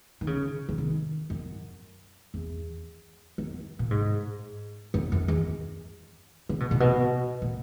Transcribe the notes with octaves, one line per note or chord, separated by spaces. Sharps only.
D#3
C#3
C#3
D#3
F#2
E2
F#2
A#2
G#2
F#2
F#2
E2
C#3
B2
A#2
B2
A#2